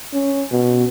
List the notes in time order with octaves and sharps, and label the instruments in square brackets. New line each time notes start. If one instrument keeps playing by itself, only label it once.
[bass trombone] C#4
B2